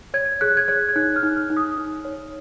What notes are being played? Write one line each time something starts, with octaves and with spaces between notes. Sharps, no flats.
C#5 G#6
G#4 F#6
G#6
C#5 F#6
G#6
D#4 F#6
F6
D#4
F6
D#4
D#6
D#4
C#5